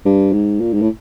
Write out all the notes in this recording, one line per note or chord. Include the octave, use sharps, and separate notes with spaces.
G2
G#2
A#2
G#2
A2